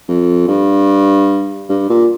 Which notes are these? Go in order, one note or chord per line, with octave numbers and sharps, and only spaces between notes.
F2
G2
G2
A#2